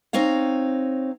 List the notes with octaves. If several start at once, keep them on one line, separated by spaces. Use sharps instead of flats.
C4 D#4 C#5 F5